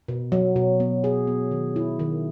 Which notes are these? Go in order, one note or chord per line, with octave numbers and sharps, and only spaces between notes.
B2
F#3
B2
B3
G#4
B3
D#3
E4
D#3